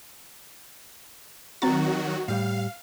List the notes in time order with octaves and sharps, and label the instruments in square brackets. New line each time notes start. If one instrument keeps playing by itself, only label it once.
[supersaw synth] D#3 F#3 F#4 [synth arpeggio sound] C4 A#5 A6
[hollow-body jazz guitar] A2 G3 [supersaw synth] F5